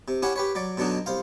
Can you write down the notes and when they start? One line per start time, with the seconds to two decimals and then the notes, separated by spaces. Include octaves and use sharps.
0.08 C3
0.22 C#4 E4 G4 C#5 F#5
0.36 G4 B4 C#5
0.55 F#3 D5
0.78 B2 D3 F#3 D4 D#4
1.06 C2 C5 F5